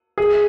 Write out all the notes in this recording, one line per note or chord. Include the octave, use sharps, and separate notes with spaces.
G#4